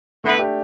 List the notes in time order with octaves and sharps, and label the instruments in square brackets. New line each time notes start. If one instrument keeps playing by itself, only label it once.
[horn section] D3 B3 E4 B4 [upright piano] A3
[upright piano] D4 G4